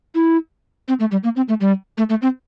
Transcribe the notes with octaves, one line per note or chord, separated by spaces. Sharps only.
E4
C4
A3
G3
A#3
C4
A3
G3
A3
A3
C4